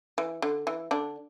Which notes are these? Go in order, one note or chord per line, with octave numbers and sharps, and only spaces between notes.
E3
D3
E3
D3 D4